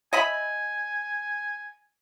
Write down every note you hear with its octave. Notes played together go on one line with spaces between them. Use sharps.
D#5 E5 G#5 B5